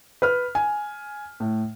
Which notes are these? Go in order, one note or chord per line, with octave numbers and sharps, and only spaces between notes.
B4 F6
G#5
A2